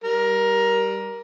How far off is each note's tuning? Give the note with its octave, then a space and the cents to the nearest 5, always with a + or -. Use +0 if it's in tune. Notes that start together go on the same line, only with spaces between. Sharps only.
G3 -5 A#4 +15